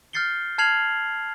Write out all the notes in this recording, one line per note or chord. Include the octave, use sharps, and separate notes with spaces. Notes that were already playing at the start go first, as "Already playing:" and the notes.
F6 G6 A6 C7 C#7 G7
A5 F6 G#6 C7 F7 F#7